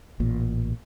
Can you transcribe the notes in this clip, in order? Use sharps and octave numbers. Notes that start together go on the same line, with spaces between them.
A1 A#2